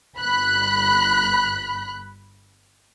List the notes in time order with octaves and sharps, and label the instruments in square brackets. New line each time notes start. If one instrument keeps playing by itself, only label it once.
[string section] G1 B5 F#6